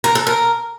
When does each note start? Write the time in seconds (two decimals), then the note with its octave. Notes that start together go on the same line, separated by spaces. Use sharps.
0.04 A#4
0.15 A4
0.27 A#4